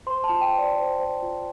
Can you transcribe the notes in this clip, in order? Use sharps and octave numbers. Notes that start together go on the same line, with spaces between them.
C5 C6
A5
F4
G5
C5
D5
C5
C5
F4